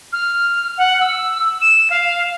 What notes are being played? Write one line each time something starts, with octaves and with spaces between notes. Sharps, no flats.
F6
F#5
E6
E7
F5